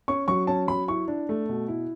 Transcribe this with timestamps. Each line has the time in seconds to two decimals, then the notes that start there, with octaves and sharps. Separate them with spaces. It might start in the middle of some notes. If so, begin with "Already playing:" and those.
0.08 C#4 C#6
0.28 F#3 C#6
0.47 C#4 A5
0.68 F#3 B5
0.88 E4 C#6
1.08 D4
1.29 A3
1.49 B2
1.68 E4